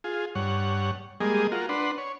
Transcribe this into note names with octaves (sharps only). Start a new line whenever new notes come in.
F4 G#4
G2 C#5 F#5
G3 G#3 A#3 G#4 D#5
F4 F#4 A#4
D4 B4 F#5 C6
C#5